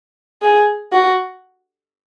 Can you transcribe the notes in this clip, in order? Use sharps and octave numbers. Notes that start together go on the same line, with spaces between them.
G#4
F#4